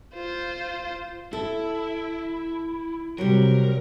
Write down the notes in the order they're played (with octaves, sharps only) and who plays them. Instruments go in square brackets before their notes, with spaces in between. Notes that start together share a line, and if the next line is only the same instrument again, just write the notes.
[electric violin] F4 C5
[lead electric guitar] E4 [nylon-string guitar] A4
[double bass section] C3 [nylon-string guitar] F#3 G3 [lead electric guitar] A#4